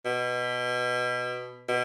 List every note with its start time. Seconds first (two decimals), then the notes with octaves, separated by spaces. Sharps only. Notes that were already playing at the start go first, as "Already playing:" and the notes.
0.05 B2
1.69 B2